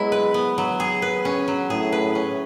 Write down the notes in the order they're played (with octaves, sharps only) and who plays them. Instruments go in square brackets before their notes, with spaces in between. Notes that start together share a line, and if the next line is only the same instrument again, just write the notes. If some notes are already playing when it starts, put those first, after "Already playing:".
Already playing: [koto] F#3 B3 E4 [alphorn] G#3
[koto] B4
B3
F#3
G#4
B4
C#4
F#3
[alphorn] A2 [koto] G#4
[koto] B4
C#4